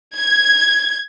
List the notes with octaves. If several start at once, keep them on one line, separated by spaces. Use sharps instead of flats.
G#6